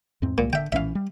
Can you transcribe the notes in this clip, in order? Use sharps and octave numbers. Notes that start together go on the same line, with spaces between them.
E2 G#2 C4
C2 A#2
D3 E5 G5
A#1 E3 C#4 E5 F5
G3